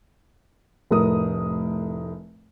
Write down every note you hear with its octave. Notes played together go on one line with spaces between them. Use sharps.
F1 A2 A#4 D#6